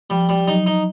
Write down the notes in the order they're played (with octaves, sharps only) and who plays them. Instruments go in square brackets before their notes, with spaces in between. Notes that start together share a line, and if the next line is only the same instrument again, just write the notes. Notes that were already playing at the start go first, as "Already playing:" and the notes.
[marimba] F3 [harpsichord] G3
[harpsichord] G3
[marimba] F#3 [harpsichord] D#4
[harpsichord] D#4